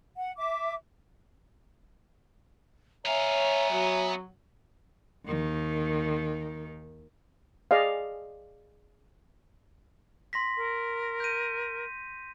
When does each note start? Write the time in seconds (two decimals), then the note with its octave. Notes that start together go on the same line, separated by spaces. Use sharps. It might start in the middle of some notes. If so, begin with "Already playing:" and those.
0.15 F#5
0.37 E5 D6
3.05 B3 C#5 E5 F5 G#5 A#5
3.70 F#3
5.27 D#2 D#3
7.71 G#4 D5 D#5 F5
10.33 C6 A#6 B6
10.57 A#4
11.20 G6 D#7